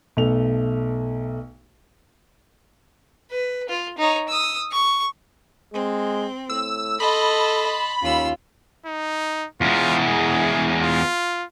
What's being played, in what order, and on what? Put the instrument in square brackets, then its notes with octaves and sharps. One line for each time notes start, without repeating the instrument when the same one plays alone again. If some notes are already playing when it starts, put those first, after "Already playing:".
[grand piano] B1 A3 F7
[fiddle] B4
F4
D#4 C#5
D#6 E6
C#6
[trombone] G#3 [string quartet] C4
[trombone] A2 [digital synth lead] E6
[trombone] A4 [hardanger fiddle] D#5 [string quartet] A5 C6 [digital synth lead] B5
[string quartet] D#2 E6 [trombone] C#4 [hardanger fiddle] F4
[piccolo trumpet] D#4
[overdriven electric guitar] E2 G#3 [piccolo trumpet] F4
[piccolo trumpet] G#4
F4